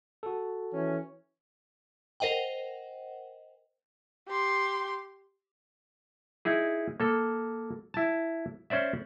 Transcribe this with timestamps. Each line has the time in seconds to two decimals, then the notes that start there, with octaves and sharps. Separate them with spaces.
0.23 F#4 A4
0.73 E3 C#4
2.20 A#4 C5 D#5 F#5 G5
4.28 G4 C6
6.45 D#4 E4 G#4
7.00 A#3 A4
7.94 E4 A5
8.70 C#4 C5 D5 E5